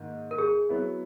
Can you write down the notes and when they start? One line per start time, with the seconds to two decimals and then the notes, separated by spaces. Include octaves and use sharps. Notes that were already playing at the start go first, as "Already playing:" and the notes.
Already playing: G#2 D#3 A#3
0.31 A#4
0.38 G#4
0.69 F#3 B3 E4